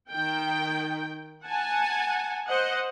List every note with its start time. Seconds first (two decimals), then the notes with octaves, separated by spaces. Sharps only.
0.11 D#3 G5
1.47 F#5 G#5 A5
2.47 C5 D#5 F#5